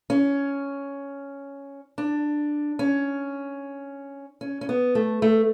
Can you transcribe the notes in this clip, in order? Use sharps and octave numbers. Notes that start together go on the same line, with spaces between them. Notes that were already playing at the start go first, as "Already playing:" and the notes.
C#4
D4
C#4
C#4
C#4
B3
A3
A3